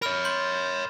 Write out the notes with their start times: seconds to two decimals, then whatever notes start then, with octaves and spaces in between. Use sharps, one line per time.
0.02 A#4 C#5 B5 F6
0.25 C6 G6